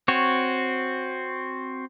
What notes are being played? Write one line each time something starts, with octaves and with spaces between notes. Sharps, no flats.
C4 F#4 C#5